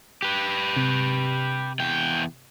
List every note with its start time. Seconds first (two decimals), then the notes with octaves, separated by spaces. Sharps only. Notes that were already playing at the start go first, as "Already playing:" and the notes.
0.22 G4 B4
0.76 C3
1.80 E2 G5